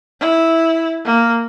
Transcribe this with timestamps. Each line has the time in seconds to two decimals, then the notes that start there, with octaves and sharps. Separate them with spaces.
0.20 E4
1.05 A#3